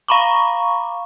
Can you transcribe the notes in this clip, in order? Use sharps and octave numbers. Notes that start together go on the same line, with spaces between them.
F5 A#5 B5 C#6 D6